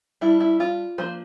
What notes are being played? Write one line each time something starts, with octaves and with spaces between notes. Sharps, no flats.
G3 D4 E4
E4
F4
F3 A#3 D4 C5